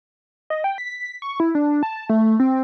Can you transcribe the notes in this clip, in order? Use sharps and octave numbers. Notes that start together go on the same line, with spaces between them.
D#5
G5
B6
C#6
E4
D4
A5
A3
C4